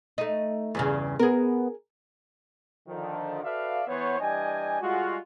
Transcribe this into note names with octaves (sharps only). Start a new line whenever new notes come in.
A3 D#4
E2 G2 C#3
B3 G#4 A#4
D3 D#3 F3
F#4 A4 B4 D5 E5 F5
E3 B3 C5 C#5
E3 G3 D4 D#5 G5 G#5
G3 G#3 F4 F#4